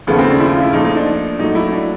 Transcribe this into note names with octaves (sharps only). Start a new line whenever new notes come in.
D#2 C#3 F3 A3 B3
C4
D4
E4
F4
E4
A#2 F3 A3 D#4
D#4
D4
A#2 F#3 A3 D#4
E4
D4